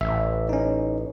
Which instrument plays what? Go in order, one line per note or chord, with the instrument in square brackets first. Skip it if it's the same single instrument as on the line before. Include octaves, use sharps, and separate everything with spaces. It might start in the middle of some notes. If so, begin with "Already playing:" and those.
[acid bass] A1 [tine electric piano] E5
[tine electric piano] C#4 D#4